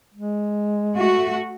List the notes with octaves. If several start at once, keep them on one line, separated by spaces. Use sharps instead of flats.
G#3
A3 F#4